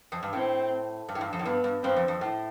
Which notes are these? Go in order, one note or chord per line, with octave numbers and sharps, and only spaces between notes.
F2
G2
A2 C4
G2
A2
G2
F2
A2
G2 B3
G2
G2 C4
F2
F2
A2